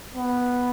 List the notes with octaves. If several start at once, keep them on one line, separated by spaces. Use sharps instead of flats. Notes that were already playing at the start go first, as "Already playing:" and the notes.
B3